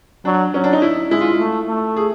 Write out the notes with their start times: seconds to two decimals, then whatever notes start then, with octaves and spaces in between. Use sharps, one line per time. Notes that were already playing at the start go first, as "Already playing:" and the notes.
0.25 F#3 D4
0.54 F#3 C#4
0.64 D4
0.73 D#4
0.82 E4
1.11 G#3 E4
1.21 F4
1.39 A3
1.68 A3
1.96 G#4